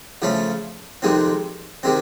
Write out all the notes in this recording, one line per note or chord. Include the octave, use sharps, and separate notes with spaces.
C#3 F3 A3 C#4
F2 C3 D#3 G#3 C4
C3 D#3 G#3 C4